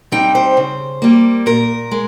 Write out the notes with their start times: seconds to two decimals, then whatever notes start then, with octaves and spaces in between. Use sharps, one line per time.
0.12 G3 C4 D#4 G5
0.35 C5
0.57 C#3
1.02 G3 A#3
1.46 A#2 A#4
1.91 G#3